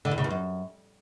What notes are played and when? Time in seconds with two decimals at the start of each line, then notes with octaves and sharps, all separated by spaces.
0.05 D3
0.11 E2
0.18 C#3
0.24 E2
0.30 F#2